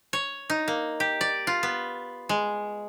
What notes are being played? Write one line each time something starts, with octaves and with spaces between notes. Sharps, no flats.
C#5
D#4
A#3
G4
D5
F4
B3
G#3